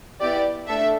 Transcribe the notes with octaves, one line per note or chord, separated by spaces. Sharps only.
B3 E4 G4 D5
A3 D4 A4 E5